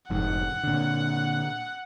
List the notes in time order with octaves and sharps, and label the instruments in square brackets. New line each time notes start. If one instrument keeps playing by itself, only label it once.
[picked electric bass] F1 F2 G#2 [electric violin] F#5
[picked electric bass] A#2 D3